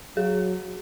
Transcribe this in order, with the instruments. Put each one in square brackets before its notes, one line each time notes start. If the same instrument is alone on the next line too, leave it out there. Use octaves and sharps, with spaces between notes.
[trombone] F#3 [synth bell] G#4